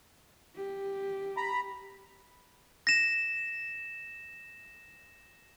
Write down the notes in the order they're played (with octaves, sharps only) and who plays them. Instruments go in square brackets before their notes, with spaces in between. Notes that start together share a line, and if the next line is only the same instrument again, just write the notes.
[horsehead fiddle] G4
[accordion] A#5 B5
[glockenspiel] A#6 E7